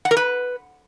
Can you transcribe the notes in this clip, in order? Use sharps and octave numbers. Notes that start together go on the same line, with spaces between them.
F#5
A#4
B4